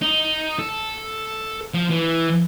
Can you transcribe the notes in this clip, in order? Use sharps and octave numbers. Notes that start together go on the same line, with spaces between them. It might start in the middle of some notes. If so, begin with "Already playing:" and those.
D#4
A4
F3
E3